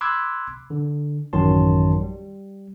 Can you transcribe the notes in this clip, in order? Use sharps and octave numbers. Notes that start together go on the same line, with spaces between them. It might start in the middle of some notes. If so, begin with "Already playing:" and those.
B5 C6 D6 E6 F#6 G#6
D3
A1 F#2 D#3 F#3 A5 C6
G3